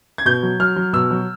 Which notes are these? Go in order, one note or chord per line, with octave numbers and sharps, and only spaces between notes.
G#6
B2 G6
F#3
F#3 F6
F#3
B2 E6
F#3